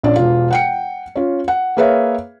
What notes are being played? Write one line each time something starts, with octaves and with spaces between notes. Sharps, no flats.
A#1 C#4 D4 D5
E1 F4
F#5 G5 C#7
C#4 F4
F#5
A#3 G#4 B4 C#5 E5 F5